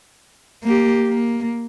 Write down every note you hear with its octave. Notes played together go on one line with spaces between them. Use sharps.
A#3 G4
A#3